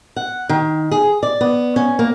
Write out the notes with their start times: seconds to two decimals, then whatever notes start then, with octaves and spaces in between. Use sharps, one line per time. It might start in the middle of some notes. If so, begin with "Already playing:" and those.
0.16 F#5
0.49 D#3
0.92 G#4
1.23 D5
1.41 B3
1.76 C#4
1.99 A#3